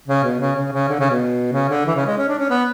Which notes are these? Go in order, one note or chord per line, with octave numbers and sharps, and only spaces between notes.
C#3
B2
C#3
C#3
C#3
D3
C#3
B2
C#3
D3
E3
C#3
G#3
C#4
D4
C#4
B3